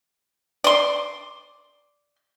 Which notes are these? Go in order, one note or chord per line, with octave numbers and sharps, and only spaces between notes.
D5 C6